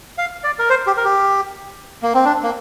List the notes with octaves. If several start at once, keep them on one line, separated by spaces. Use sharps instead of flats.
F5
D5
A#4
C5
G4
A#4
G4
A#3
C4
D4
A#3